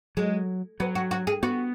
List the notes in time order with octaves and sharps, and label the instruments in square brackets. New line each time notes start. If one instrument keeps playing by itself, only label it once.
[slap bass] F#3 [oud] G#3
[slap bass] F#3 [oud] B3
[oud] F#4
F#4
G#4
[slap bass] B3 [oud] F#4